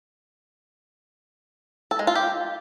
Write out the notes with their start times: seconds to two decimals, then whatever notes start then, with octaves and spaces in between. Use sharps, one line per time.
1.91 A4
1.99 G#3
2.07 F4
2.15 G4